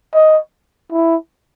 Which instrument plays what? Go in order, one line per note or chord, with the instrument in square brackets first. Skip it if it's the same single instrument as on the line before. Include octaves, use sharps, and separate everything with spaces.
[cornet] D#5
E4